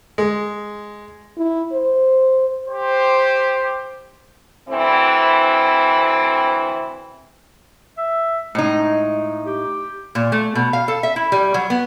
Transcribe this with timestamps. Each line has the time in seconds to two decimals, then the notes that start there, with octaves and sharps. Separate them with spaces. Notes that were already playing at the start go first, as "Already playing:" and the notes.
0.18 G#3
1.37 E4
1.73 C5
2.67 G4 C5
4.69 D2 E3 C4 E4
7.98 E5
8.55 A2 G#3 D#4
9.46 G4
10.15 A#2
10.32 A3
10.55 B2
10.73 F5
10.88 A4
11.03 E5
11.16 E4
11.32 G3
11.54 F#3
11.70 B3